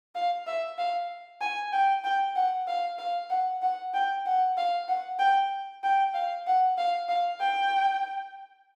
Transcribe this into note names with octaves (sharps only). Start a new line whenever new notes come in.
F5
E5
F5
G#5
G5
G5
F#5
F5
F5
F#5
F#5
G5
F#5
F5
F#5
G5
G5
F5
F#5
F5
F5
G5